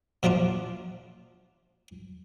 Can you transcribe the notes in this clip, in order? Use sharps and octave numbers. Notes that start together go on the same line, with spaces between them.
A#2 F3 A#3 D4 F4